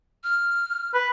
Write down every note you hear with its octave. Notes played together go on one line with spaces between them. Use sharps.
F6
B4